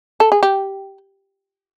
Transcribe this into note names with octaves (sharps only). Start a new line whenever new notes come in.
A4
G#4
G4